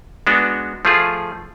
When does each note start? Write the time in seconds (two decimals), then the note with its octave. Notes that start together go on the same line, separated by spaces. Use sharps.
0.27 G#3 B3 D4 F#4
0.85 F3 A3 F4 G#4